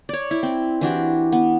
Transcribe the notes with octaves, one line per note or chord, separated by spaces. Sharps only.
C#5 D5
E4
C4
E3 D4 F#4 G4
B3